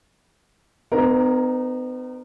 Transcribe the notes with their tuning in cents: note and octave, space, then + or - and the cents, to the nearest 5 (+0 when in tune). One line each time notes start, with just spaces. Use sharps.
B3 +45 D#4 -35 A#4 +0